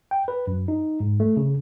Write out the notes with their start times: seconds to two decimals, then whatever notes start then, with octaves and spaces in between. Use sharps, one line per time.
0.11 G5
0.28 B4
0.47 F#2
0.68 D#4
1.00 G#2
1.20 A3
1.37 C#3